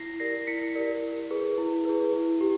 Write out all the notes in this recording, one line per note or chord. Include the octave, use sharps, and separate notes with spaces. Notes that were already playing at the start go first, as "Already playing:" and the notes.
Already playing: E4 A#6 C7
G4 A#4 D5 A#6 C7
E4 B6 C#7
G4 A#4 D5
E4
G#4 B4
E4
G#4 B4
E4
G4